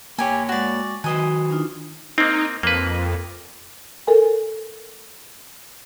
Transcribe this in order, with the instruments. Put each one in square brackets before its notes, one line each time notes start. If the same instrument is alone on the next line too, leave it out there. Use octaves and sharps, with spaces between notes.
[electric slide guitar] A#3 C#5 [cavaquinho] G4 G#5
[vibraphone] G#3 C#6 [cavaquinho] F#4 D5
[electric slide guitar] D#3 B4 [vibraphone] F#4 [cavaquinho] C5 D#5 G#5
[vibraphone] D4 D#4 F4
[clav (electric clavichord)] A#3 C4 [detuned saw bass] D#4
[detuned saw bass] F2 [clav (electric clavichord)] A#3 B4
[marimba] A4 A#4 G#5